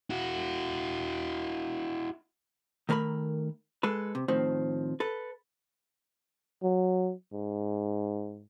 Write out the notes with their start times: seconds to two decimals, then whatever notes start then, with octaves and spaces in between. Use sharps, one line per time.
0.10 E4 F#4
2.89 D#3 A3 A#4 A#5 B5
3.83 G#3 A4 B4
4.15 C3
4.28 A2 D#3 F3 C4
5.00 A4 B4
6.63 F#3
7.32 G#2